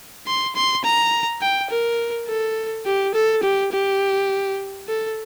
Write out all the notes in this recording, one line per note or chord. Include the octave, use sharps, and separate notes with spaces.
C6
C6
A#5
G5
A#4
A4
G4
A4
G4
G4
A4